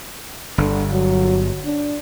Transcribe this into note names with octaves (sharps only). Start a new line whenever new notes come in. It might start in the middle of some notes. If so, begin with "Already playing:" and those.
G1 D3
F#3
D4